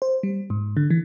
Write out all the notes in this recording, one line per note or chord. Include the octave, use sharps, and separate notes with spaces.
C5
G3
G#2
D3
E3